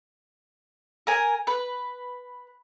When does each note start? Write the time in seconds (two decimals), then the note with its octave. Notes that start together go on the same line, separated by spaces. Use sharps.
1.07 A#4 G#5
1.47 B4